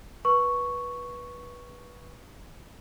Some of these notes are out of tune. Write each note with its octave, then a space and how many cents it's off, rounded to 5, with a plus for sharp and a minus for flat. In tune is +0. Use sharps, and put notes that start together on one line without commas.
B4 -20 C#6 +0